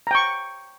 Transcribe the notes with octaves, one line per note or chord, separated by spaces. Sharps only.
G5 A#5 C#6